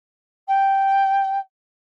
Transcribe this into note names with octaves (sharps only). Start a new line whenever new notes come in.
G5